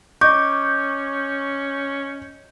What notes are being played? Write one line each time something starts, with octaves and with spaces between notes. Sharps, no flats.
C#4 D#5 C#6 D6 G6